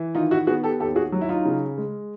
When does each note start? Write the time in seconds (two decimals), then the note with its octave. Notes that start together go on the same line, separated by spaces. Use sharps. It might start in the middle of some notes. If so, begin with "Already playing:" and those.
Already playing: E3
0.15 D#3 D#4 F4
0.31 E4 F#4
0.47 B3 F#4 G#4
0.63 G4 A4
0.80 D#2 G4 A4
0.96 F#4 G#4
1.12 F#3
1.21 E4
1.29 D#4 F4
1.45 C#3
1.78 G#3